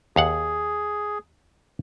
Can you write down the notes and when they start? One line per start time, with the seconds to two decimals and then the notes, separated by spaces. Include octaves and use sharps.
0.16 D#2 G#4 F5 F#5